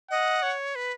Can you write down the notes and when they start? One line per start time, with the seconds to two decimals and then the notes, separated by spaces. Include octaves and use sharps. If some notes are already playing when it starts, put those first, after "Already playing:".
0.11 D#5 F#5
0.42 C#5
0.75 B4